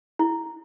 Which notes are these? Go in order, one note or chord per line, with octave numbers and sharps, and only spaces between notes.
E4